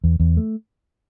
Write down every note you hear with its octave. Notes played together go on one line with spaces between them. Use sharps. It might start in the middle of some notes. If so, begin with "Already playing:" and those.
E2
E2
A3